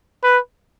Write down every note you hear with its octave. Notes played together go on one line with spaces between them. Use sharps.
B4